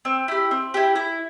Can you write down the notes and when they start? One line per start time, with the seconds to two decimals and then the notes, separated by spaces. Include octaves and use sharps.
0.05 C4
0.28 E4 G4
0.51 C4
0.74 E4 G4
0.96 E4